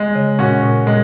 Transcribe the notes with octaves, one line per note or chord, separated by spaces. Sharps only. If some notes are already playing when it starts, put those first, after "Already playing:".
Already playing: G#3
C#3
A#2 C#4 F#4
A#2
A#2 G#3